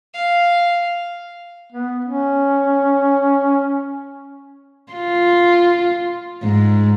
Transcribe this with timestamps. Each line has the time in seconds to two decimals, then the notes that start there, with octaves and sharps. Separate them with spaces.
0.14 F5
1.72 B3
2.05 C#4
4.92 F4
6.43 G#2